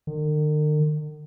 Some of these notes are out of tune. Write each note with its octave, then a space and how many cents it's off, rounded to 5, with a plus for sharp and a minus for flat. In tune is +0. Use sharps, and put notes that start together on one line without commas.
D#3 -45